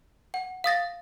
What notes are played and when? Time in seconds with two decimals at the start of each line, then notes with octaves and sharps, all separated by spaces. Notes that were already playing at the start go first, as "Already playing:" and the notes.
0.34 F#5
0.64 F5 D#6 A6 A#6